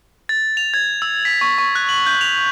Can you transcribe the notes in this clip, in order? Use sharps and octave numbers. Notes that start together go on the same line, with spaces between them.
A6
F7
G#6
E6
B6
C#6
C#6
F#6
F#7
G6
F7